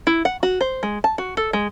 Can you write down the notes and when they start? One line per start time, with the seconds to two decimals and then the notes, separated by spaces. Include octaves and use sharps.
0.07 E4
0.25 F#5
0.43 F#4
0.61 C5
0.83 G#3
1.04 A5
1.18 F#4
1.37 A4
1.53 G#3